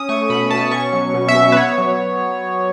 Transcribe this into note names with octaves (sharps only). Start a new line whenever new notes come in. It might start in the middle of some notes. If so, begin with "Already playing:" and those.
Already playing: C#4 D#6
A3 C#6
B2 B5
B2 A5
C#4 C#6
F#3
B2
E5
B2
B4
B3 C#5
F#3